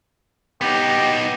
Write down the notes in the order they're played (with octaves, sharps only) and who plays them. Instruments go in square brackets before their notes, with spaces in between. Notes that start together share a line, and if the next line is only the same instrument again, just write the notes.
[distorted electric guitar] B3 D#4 [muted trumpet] G4